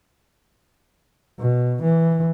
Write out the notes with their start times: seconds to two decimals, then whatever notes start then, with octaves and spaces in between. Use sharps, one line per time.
1.39 B2
1.83 E3